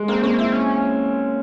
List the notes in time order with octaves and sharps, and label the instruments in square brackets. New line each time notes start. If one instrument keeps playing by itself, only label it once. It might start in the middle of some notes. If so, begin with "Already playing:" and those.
Already playing: [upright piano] G#3
[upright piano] A#3 [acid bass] C4
[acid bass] A#3 [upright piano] C4
[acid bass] C4 [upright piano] E4
[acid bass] C#4